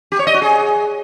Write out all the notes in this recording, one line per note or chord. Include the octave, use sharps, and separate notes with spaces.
G4
C#5
D#5
F#4
G#4